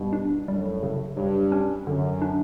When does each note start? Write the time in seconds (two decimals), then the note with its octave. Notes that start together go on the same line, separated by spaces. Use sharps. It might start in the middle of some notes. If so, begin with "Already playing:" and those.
Already playing: G2 B2
0.13 D4
0.48 F#2 A2 G3
0.83 C#3
1.17 G2 F#3
1.52 C#4
1.87 F#2 D3
2.22 D4